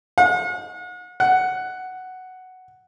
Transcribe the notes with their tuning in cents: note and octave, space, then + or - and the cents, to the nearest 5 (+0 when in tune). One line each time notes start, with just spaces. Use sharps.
F#5 -40
F#5 +5